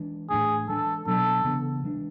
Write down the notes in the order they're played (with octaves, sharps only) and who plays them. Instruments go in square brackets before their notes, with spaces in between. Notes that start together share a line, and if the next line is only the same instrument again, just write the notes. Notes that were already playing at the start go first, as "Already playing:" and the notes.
Already playing: [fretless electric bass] E3 G#3 D4
[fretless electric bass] A2 E3 A3 D4 [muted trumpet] G#4
[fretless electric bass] E3 G#3 D4 [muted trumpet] A4
[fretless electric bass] B2 F#3 B3 D4 [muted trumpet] A4
[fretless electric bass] C#3 E3 B3 D4
E3 G#3 D4